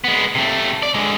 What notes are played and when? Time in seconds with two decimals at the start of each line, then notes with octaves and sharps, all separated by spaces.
0.04 G#3 B3
0.35 C3 A3
0.83 D5
0.94 D3 G#3